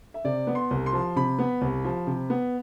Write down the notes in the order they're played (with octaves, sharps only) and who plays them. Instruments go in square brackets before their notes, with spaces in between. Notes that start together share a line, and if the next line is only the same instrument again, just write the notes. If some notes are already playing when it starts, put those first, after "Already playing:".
[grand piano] E5
C3 D5
B3
C6
C2
C6
F3
C3 B5
B3
C2
F3
C3
B3